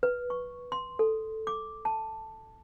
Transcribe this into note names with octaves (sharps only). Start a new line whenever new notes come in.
B4
C#6
C6
A4
D6
A5